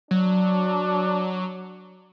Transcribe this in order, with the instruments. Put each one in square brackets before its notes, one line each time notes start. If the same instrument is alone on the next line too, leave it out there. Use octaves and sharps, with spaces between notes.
[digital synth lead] F#3 [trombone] D4